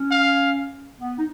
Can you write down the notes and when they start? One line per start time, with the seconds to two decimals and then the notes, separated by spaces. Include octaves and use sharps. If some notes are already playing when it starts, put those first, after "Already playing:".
Already playing: C#4
0.11 F5
1.00 B3
1.17 D#4